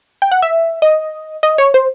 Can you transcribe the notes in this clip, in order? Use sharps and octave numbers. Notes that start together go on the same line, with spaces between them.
G5
F#5
E5
D#5
D#5
C#5
C5